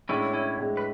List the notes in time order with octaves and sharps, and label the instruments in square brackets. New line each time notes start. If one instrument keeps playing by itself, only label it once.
[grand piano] A2 G#3 D4 [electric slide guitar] C#4 E4
[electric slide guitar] C#4 E4
[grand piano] A2 G#3 D4
[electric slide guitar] B4